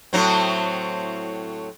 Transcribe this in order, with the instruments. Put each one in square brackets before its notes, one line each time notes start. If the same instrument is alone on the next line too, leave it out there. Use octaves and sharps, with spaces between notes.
[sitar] A2 F#3 C4